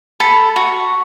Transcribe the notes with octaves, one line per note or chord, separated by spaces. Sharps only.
A4 B5
F#4